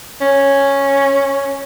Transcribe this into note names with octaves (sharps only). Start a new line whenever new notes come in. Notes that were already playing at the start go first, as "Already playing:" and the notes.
C#4